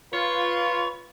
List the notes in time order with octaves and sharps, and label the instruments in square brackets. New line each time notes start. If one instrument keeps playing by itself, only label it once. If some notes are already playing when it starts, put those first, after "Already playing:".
[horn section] F4 [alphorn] B4 [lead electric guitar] C#5